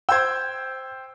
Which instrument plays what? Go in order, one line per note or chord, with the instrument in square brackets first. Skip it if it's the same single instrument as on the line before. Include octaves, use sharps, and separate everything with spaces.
[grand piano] C5 G5 [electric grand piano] E6 G6 G#6